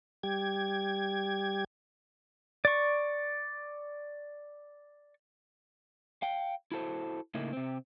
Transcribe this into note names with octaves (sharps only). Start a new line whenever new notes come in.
G3 G4 G#6
D5 C#6
F5 G5
E4 F#4 A4 C5
A2 C#3 A#3 D#4 E4
C3 C4